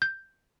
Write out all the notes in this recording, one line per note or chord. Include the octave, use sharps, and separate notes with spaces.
G6